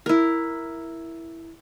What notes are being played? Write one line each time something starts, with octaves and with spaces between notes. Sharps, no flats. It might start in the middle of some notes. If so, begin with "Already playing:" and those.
E4 A#4